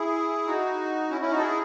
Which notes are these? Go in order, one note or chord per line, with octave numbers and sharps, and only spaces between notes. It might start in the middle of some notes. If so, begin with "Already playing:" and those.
Already playing: E4 G#4
D#4 F#4
C#4 E4
C#4 E4
D#4 F#4
A4
E4 G#4